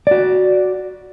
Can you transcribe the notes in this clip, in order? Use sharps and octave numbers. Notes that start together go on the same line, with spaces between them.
F#4 D5